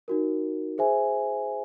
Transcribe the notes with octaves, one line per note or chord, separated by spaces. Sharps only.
D#4 F#4 A#4
G#4 C5 E5 G#5